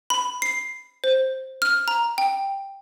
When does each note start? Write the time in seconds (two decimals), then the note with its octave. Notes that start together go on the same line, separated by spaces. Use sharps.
0.10 B5
0.42 C7
1.04 C5
1.62 F6
1.88 A#5
2.18 G5